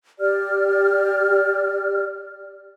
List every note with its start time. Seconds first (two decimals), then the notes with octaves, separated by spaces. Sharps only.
0.20 G4 D5 F6